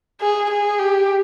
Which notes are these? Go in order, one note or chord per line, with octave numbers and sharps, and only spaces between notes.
G#4
G#4
G4